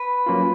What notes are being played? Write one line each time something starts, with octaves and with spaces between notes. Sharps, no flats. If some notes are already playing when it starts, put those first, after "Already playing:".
Already playing: B4
F#3 A#3 C#4 F4